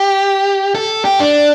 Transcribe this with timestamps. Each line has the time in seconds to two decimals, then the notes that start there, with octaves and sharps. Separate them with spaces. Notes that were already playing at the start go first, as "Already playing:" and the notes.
Already playing: G4
0.75 A4
1.05 G4
1.20 D4